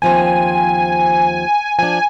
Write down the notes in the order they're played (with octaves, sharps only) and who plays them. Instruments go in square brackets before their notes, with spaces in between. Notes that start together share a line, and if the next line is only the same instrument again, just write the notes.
[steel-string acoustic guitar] D#2 F3 C4 [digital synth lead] G#5
[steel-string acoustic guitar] F3 D4 [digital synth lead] G#5